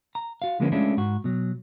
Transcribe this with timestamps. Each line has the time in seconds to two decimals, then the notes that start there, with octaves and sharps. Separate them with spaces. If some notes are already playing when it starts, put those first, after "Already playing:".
0.15 A#5
0.42 F#4 F5
0.60 D3 F3 G#3 A#3 B3 C#4
0.72 G#3 A3 C#4 D4 E4 F4
0.97 G#2 F#4
1.24 B2 F#3